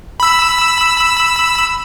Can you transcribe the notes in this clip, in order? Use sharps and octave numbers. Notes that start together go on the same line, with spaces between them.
B5 E6